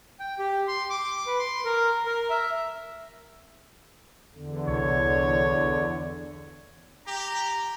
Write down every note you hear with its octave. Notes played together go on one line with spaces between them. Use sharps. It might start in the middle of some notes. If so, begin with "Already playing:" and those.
G5
G4
C6
D6
B4
C6
A#4
A#4
E5
E2 D3
C2 C#5
G4 A#5